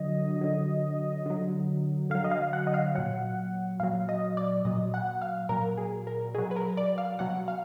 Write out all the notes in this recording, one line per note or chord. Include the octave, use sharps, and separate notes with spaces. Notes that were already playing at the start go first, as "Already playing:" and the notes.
Already playing: D3 F#3 D#5
D3 F#3
D3 F#3
D3 F#3 F5
D#5
F5
F#5
D#5
F5
A#2 F#3 F#5
A#2 F#3 F5
D#5
D5
A#2 F#3 D#5
F#5
F5
A#2 F#3 A#4
G#4
A#4
B2 F#3 G#4
B4
A#4
D5
F5
B2 F#3 F#5
F5